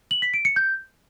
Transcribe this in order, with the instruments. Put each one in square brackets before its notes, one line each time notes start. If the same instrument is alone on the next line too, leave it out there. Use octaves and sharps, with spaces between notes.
[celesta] F#7
B6
D7
C#7
G6